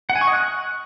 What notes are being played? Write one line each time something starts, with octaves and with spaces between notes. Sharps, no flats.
F#5
G#5
C#6
D#5
F#6